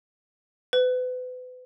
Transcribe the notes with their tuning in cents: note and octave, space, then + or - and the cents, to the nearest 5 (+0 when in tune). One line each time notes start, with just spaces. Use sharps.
B4 +35